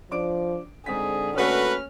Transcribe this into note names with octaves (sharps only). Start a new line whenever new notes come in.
F3 D4 D6 D7
G#2 D3 C4 G#4 B6
A3 A#3 C#4 F#4 A4 B4 F6